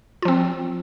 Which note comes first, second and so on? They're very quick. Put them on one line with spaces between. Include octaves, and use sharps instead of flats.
F4 F3 C4